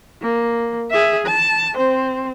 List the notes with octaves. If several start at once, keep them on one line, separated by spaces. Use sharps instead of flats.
A#3
G#4 E5
A5
C4 C5